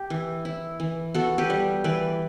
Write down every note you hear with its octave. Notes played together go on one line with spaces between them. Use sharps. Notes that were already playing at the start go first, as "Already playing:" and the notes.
Already playing: G4
E3
E4
E3
B3 F#4 A4
G4 B4
G3
E3 B4 D5